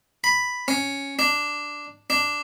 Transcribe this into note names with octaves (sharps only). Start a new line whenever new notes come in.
B5
C#4
D4
D4